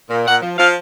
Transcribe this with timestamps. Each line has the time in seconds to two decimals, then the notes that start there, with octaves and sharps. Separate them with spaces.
0.10 A#2
0.26 A#2 F#5
0.42 F3
0.58 F3 F5